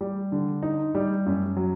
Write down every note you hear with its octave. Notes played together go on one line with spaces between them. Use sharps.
G3
D3
D#4
G3
F#2
F#3